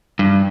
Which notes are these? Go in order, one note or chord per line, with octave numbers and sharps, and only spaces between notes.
G2